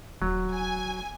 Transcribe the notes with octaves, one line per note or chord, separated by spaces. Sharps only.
D#1 F#3
G#5